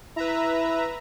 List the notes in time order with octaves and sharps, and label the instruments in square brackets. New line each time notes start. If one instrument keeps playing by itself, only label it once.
[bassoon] E4 [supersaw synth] B4 E5 A#5